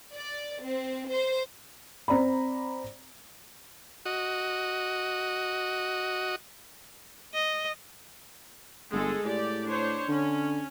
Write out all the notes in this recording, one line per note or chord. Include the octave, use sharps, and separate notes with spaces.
D5
C4
C5
C4 D5 A#5 B5
F#4 D#5
D#5
G1 G#3 G#4 A4
A2 G4 D5
D4 C5 C#5
D3 C#4